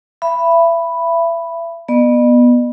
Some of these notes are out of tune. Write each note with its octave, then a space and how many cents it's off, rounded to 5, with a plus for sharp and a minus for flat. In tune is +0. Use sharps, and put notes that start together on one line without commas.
E5 +30 B5 +0
B3 -15 D#5 -45